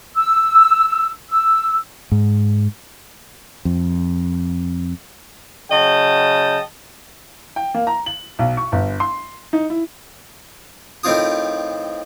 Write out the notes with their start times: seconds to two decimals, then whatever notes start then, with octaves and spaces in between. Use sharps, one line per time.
0.16 E6
1.29 E6
2.12 G#2
3.65 F2
5.71 C#3 F#3 D#5 G5 A5
7.56 G5
7.75 A#3
7.87 A#5
8.06 F#7
8.39 B1
8.57 C#6
8.72 G1
9.00 C6
9.53 D#4
9.70 E4
11.03 A2 D#3 C4 F4 D#6